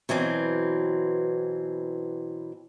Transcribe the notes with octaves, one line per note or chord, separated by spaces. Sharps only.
B2 E3 F#3 C4